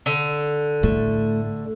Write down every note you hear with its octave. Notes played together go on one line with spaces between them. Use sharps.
D3
A2 A3